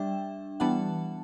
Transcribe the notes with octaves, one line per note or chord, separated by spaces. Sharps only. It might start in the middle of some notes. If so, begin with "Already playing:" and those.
Already playing: G3 D4 E5 G5
E3 G3 B3 D4 F#5 A5